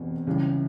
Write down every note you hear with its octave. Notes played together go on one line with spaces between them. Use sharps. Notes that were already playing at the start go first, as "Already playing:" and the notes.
Already playing: F1 E2 B2
C#2 C#3 E3 G3